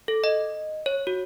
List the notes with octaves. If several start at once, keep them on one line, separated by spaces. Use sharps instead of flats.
A4
D#5
C#5
F#4